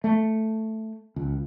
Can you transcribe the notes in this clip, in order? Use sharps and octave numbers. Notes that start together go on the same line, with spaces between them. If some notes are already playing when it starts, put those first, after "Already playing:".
A3
C#2